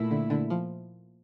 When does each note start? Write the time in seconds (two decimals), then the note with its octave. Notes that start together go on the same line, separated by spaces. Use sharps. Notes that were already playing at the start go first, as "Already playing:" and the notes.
Already playing: A#2 A3 E4
0.11 D3
0.30 D3
0.50 F3